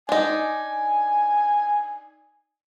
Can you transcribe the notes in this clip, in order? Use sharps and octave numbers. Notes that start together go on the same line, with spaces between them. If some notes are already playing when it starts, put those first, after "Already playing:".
D4 D#4 G#5